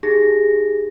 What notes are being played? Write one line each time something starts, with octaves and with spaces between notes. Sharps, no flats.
D#4 G4 G#4 A#6